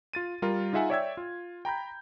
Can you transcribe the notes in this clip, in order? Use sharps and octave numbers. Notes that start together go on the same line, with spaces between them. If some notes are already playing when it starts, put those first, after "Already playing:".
F4 A6 D#7
G3 F4 A#4
D#4 F4 G#4 E5 F#5 G#5
C#5 D5 E5 G5 E6 G#6
F4
G5 A#5 B5 G6